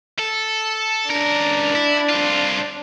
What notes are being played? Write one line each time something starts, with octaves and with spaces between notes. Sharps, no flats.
A4
C#2 D4 A#4
E4
C2 F4